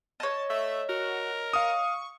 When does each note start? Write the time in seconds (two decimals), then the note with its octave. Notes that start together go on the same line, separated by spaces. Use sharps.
0.20 C#5 D#5 A5
0.50 A3 E5
0.89 F#4 A#4
1.53 F5 C#6 D#6